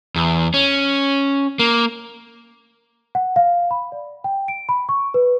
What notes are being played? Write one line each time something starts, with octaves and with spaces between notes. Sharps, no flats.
E2
C#4
A#3
F#5
F5
B5
D5
G5
D7
B5
C#6
B4